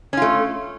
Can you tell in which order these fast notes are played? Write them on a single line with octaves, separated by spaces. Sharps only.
C#4 F4 A3